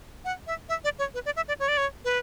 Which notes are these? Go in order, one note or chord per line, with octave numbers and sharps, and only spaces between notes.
F#5
E5
E5
D5
C#5
B4
D5
E5
D5
C#5
D5
C#5
B4